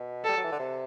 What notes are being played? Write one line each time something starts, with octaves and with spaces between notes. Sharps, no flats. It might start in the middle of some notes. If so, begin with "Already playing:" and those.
Already playing: B2
G3 A4
F#3
E3
D3
C3